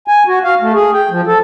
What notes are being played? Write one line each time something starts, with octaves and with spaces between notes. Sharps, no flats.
G#5
F#4
F5
A3
G#4
G5
F3
A4